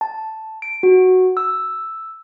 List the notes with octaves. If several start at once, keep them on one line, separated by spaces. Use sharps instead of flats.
A5
D7
F#4
E6